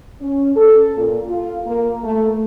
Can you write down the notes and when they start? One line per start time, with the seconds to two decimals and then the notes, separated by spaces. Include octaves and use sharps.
0.22 C#4
0.56 A4
0.98 A#2
1.29 F4
1.67 A#3
2.04 A3